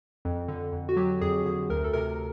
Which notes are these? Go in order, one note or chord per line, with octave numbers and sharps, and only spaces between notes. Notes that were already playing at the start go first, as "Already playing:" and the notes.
F2
D3
F2
F#4
F#3 G4
F2 G#4
D3 G#4
D2 A#4
A4
C3 A#4